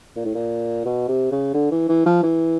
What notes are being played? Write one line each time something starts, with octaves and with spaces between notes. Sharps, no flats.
A#2
A2
A#2
B2
C3
C#3
D3
E3
E3
F3
E3